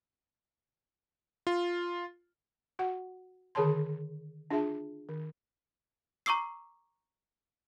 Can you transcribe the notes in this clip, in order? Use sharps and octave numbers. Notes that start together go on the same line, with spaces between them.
F4
F#4 F#5
D3 D#3 G#4 C#5 A5 C6
D4 F4 G#4 E5 A5
D#3
A#5 C#6 D6 E6 C7